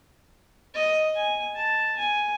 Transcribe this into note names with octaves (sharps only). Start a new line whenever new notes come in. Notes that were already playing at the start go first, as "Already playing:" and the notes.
D#5
G#5
A5
G#5